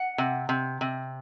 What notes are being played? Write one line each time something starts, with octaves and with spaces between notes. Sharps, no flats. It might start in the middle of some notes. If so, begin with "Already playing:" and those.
Already playing: F#5
C3
C3
C3